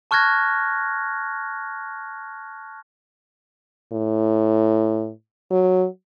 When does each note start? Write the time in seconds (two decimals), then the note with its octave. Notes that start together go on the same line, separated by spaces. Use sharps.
0.11 A5 C#6 F6 F#6 G#6 A#6
3.93 A2
5.51 F#3